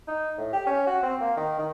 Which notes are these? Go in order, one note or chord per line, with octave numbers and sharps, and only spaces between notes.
D#4
A2
G4
C#4
F#4
C4
A#3
D#3
D#3